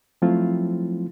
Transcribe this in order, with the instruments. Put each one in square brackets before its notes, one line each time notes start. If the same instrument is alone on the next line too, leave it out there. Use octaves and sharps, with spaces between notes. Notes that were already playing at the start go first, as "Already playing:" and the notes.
[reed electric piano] F3 F#3 A3 C4 E4 F4